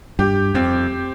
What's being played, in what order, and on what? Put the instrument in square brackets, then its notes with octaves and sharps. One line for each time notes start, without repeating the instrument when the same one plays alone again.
[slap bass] G2 [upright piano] G4
[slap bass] F2 [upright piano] C4